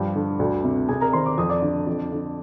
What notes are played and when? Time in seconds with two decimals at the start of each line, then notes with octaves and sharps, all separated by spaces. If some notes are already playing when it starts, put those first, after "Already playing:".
Already playing: G2 F3 G4 G5
0.15 D3
0.39 D2
0.64 C3
0.88 C3 G#4 G#5
1.01 A#4 A#5
1.13 D#3 C5 C6
1.26 D6
1.38 F2 D#6
1.49 D5 D6
1.62 D3
1.87 F2
2.12 D3